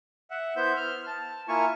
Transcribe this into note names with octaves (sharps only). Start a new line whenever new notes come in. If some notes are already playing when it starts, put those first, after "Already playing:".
E5 F#5
B3 E4 C5 E5 G6
F6
A5
A#3 E4 F4 G#5 C#6